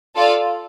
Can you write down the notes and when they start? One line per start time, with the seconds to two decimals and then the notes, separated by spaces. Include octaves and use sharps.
0.16 F4 A4 D5 F5